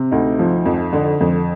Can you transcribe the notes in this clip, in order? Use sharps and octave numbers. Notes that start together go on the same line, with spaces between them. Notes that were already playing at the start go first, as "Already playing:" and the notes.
Already playing: C3
D2 D#4
F3
F2
D3
F2